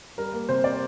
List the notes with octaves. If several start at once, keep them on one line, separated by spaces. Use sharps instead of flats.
G3 A#4
A#3
C3 C5
D5